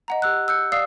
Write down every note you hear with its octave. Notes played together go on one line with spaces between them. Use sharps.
D#5 F#5 A#5
G4 E6 F#6
E6 F#6 G6 C#7
D5 F5 D#6 E6 C7